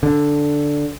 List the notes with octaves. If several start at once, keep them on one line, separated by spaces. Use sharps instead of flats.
D3